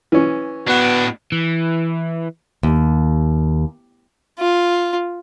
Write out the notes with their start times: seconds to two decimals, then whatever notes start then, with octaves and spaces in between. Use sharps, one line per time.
0.12 E3 C#4
0.67 A2 B3 D4 F#4
1.32 E3
2.63 D#2
4.39 F4